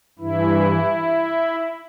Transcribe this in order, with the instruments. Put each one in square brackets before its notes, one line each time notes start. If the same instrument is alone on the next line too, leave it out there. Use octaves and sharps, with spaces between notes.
[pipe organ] G2 E3 E4